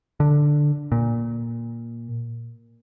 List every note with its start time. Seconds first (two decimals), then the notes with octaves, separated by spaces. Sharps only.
0.20 D3
0.92 A#2